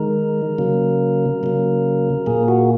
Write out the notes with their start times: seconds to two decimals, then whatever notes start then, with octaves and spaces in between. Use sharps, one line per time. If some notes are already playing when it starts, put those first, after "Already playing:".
Already playing: D#3 G#3 A#4
0.58 C#3 F#3 A#3
1.43 C#3 F#3 A#3
2.26 A#2 A#3 G#4
2.48 F#4